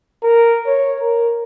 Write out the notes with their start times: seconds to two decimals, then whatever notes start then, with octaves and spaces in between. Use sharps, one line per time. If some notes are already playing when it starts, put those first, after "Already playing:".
0.24 A#4
0.67 C#5
1.00 A#4